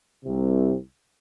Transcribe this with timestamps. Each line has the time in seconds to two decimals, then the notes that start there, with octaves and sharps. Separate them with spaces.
0.24 C2 C3